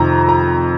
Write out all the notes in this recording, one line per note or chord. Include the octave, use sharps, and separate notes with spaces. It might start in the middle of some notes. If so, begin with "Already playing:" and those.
Already playing: F2 C3 D#3 A#5
A#5